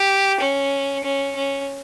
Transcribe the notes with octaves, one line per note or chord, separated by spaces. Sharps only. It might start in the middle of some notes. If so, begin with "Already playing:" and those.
Already playing: G4
C#4
C#4
C#4